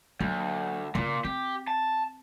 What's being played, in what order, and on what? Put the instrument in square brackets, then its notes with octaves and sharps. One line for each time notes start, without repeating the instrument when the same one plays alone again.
[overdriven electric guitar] D2 [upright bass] F#3 A#3
[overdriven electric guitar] A#2 [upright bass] C#3 F4
[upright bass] C4 [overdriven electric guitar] G4
[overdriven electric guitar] A5